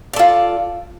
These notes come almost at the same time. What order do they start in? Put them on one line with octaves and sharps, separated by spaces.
D5 A4 F4